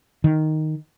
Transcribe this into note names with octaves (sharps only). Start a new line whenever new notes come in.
D#3